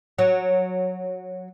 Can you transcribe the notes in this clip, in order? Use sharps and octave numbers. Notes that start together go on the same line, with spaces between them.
F#3